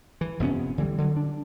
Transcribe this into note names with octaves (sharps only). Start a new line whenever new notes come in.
E3
F1 C3 B3 C#4
D3 E3 F3 G3
D3 F#3
D4